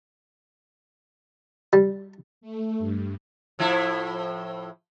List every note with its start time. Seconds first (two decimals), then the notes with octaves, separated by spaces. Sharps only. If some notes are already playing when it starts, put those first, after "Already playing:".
1.73 G3
2.41 A3
2.79 G2
3.59 A2 F3 E4